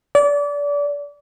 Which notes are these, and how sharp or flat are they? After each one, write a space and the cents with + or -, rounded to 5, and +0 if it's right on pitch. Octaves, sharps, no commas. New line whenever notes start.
D5 -30